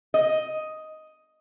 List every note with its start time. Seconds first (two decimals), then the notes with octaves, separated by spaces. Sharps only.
0.14 D#5